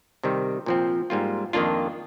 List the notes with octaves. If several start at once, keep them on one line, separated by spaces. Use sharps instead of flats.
C3 D#3 G3
A#2 F3 C4
G#2 G3 A#3 F4
F2 D#3 A#3 D4 F4